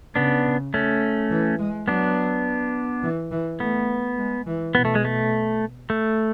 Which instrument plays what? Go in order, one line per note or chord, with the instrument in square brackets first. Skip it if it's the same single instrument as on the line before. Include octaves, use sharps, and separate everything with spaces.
[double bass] C#3 [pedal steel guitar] B3 D4
[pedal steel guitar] A3 C#4
[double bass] E3
G#3
[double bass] F#3 [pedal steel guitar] B3 D4
[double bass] E3
E3
[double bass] A3 [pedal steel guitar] B3
[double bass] G#3
E3
[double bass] B2 [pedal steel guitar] B3
[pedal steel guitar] A3
G#3
A3
A3